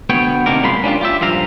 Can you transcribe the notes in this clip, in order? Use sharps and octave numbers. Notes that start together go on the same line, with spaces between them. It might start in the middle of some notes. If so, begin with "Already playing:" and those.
D2 B3 C#5 G5
C3 D#3 A#3 D4 A#4
F#2 A#2 G#3 A#3 B5 C6
C#4 D4 F4 G4
F4 G4 E5
G2 A#2 F3 F5 A#5